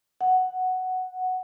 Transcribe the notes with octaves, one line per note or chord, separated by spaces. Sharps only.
F#5